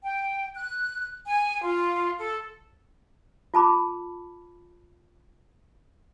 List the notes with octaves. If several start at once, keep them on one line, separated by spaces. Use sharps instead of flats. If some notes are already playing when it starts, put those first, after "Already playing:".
G5
F#6
G#5
F4
A4
F4 A5 B5 D6